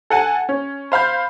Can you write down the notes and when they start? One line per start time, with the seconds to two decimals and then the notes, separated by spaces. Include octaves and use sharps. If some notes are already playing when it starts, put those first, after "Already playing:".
0.10 A4 F#5 G#5 A5
0.49 C#4
0.92 C5 F5 B5 G6